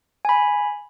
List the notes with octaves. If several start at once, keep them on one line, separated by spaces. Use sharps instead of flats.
G#5 B5